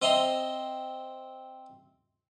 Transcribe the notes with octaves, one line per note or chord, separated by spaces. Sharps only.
C4 D#5 E5 A#5 C6